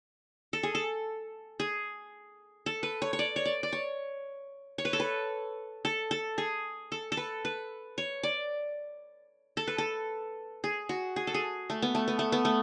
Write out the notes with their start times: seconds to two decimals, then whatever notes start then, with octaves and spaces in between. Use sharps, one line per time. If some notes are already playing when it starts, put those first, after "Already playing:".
0.53 A4
0.63 G#4
0.75 A4
1.60 G#4
2.66 A4
2.83 B4
3.02 C#5
3.13 C#5
3.19 D5
3.36 C#5
3.45 D5
3.63 D5
3.73 C#5
4.78 C#5
4.85 B4
4.93 A4
5.00 B4
5.85 A4
6.11 A4
6.38 G#4
6.92 A4
7.12 A4
7.17 B4
7.45 B4
7.98 C#5
8.23 D5
9.57 A4
9.67 B4
9.78 A4
10.64 G#4
10.89 F#4
11.16 G#4
11.27 A4
11.34 G#4
11.70 A3
11.82 B3
11.95 A3
12.08 B3
12.19 A3
12.32 B3
12.45 A3